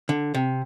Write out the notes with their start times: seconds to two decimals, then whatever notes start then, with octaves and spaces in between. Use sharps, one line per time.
0.09 D3
0.34 C3